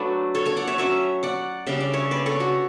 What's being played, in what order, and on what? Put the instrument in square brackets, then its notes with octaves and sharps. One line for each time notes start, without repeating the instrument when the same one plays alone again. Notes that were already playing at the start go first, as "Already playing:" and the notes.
Already playing: [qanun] F#3 A3 D4 B4 D5
A4 C#5
A4 C#5
D5 F#5
C#5 E5
F#3 C#4 C#5 E5
D5 F#5
C#3 G3 D4 E5
D5
C#5 E5
B4 D5
A4 C#5
F#4